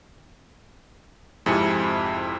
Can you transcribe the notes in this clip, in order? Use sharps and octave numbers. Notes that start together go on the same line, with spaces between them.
F2 G#2 C3 E4 G#5 C#7